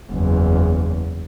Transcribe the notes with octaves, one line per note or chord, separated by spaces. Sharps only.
F#1 E2